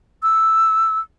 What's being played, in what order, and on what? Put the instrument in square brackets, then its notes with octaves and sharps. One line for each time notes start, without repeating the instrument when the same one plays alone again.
[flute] E6